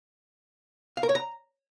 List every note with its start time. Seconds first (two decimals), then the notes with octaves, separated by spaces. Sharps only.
0.97 F5
1.03 A#4
1.09 C#5
1.15 A#5